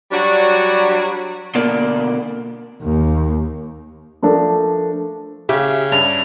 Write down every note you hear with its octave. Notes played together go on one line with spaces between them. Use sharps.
F#3 G3 D4 F#4
B2 D3 A#3 A#4 D5
D#2
F3 A3 D4 A#4
C#3 G4 E5 F5
G2 C#4 D4 F7